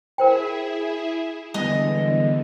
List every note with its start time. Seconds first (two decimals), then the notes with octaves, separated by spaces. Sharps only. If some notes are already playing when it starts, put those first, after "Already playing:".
0.18 E4 G#4 A#4 C5 E5 G5
1.54 E2 D3 G3 G#3 B3 D#5